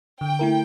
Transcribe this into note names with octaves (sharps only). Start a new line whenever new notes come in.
D3 G5
A3 E4 A#4